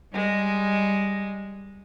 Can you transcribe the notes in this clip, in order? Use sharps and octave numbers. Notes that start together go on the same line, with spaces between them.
G3 G#3